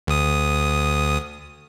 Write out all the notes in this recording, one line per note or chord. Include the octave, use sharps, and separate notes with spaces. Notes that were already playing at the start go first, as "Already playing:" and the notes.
D2 D#6